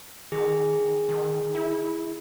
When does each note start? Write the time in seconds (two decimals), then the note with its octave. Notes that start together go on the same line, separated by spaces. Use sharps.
0.32 D#3 G#4
1.09 D#3
1.55 E4